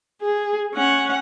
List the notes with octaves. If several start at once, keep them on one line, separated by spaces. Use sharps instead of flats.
G#4
C#4 F#5